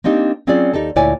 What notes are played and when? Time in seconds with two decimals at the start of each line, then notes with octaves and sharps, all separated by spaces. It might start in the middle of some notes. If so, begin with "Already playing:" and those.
0.04 A#3 C4 D4 D#4 G4
0.47 F#3 C4 C#4 F4 G#4 D5
0.74 D#2 D#4 G4 A4 A5
0.96 D2 A#2 E4 C#5 D5 G#5